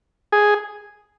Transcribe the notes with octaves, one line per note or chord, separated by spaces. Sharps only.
G#4